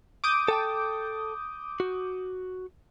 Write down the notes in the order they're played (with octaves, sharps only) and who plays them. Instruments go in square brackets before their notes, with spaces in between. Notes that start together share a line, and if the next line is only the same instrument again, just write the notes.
[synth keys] D6 D#6 G6
[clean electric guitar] A4 G5 A5
F#4